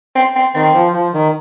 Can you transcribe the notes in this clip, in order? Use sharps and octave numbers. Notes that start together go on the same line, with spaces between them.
C4
C4
D#3 C4
F3
F3
D#3